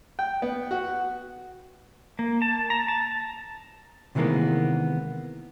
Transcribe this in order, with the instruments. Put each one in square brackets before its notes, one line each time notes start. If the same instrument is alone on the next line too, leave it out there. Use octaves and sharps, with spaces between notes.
[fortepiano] G5
B3
F#4
[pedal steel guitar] A#3
A5
A#5
A5
[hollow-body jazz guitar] C3 D#3 E3 G#3 A#3 B3